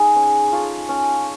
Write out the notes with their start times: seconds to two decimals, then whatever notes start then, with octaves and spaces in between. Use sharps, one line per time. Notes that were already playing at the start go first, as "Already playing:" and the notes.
Already playing: D#4 G#4
0.16 C#4
0.52 F4 A4 C#5
0.89 C#4